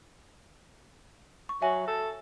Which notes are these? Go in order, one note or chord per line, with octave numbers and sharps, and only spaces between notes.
C#6
F#3 E5 G#5
A4